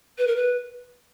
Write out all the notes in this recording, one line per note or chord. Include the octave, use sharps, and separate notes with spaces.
B4
A#4
B4